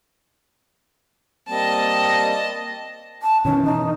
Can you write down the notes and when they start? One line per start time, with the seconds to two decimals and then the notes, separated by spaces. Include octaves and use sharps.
1.49 G3 A#3 C4 D#5 A5
3.22 A5
3.45 B2 D#3 E3 C#4
3.65 D#4